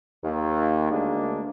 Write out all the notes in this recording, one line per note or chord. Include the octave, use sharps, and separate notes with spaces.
D#2
D2 G#3 A#3 D4